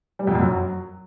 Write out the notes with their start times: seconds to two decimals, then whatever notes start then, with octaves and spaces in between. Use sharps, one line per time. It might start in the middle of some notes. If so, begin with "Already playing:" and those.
0.19 G3
0.27 F2
0.35 F#2
0.43 F#3